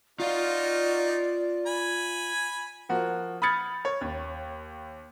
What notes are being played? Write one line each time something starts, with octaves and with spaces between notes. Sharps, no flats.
D#4 F4 F#4 D5 F5
G#5 B5
F3 A#3 F#4
B5 D#6 F6 G#6 A6 C#7
C#5
D#2